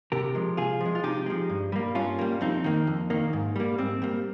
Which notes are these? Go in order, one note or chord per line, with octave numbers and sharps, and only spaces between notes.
C3 G4 A#4
F3 G#3
C3 F4 G#4
F3 G#3
F4
C3 D#4 G4
F3 G#3
G2
G3 A#3
G2 C#4 F4
G3 A#3
F2 C4 D#4
D#3 A#3
F2
D#3 A#3
G#2
G3 A#3
G#2 C4
G3 A#3